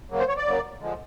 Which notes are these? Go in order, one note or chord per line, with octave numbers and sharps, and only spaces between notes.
C#3 F#3 A#3
C5
C#5
D5
C#3 F#3 A#3
D3 F3 G#3